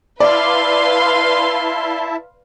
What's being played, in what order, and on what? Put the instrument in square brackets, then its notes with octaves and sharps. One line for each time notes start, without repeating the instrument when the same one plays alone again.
[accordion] E4 E5 A5 [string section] B4 F5 C6 [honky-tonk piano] D5